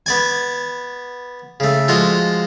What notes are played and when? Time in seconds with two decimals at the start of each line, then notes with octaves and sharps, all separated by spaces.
0.06 B3 D5 G#5
1.60 C#3 A3
1.88 F3 G#3 F4 F#4 D#5